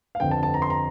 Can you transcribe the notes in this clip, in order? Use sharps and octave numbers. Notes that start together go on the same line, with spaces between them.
F5
G1 F2 D3 G5
A5
A5
A#5
C6
A#5